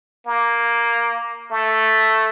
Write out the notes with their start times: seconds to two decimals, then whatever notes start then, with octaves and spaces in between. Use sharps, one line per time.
0.26 A#3
1.51 A3